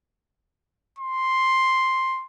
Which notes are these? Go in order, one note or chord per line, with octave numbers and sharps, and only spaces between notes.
C6